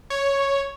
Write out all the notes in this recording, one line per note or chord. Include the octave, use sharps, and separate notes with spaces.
C#5